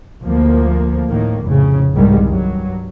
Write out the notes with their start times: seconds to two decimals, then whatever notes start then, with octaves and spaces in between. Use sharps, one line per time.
0.23 D2 F3 A#3
1.08 A2 D#3 A#3
1.43 F1 A2 C#3
1.95 C2 G#2 C3 D#3 G3 G#3
2.26 G2 F#3